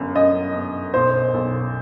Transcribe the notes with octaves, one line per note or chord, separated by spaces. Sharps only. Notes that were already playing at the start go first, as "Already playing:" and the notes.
Already playing: G1 F#2
F#2 D#5
G1
B1 C5
B1